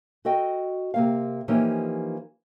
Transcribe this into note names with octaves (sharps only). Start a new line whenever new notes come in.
F#4 A4 D#5 G5
C3 A#3 F5
E3 F3 A#3 C#4 D#4 G4